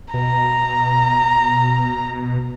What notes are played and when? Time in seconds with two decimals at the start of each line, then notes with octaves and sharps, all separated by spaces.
0.14 B2 A#5